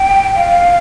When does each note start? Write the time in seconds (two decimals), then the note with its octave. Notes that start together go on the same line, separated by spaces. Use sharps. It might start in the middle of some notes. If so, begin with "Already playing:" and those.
Already playing: G5
0.36 F5